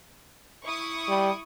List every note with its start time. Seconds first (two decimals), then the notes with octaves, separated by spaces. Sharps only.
0.63 E4 C#6 D#6
1.08 G3